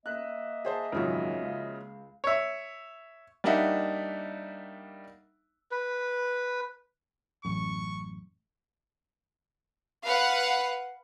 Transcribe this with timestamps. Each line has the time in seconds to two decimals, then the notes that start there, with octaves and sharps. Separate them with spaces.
0.06 A#3 D#5 E5 F#6
0.65 G#4 C5 A5
0.92 G#1 F#2 C#3 F3 F#4
1.42 C#2
2.24 C#5 E5
3.44 G3 A#3 D4 D#4 E5 F#5
5.71 B4
7.45 A1 F#2 C#6
10.05 B4 F5 F#5